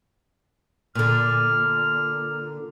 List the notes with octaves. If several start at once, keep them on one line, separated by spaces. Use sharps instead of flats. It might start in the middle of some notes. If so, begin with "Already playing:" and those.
A#2 D3 F6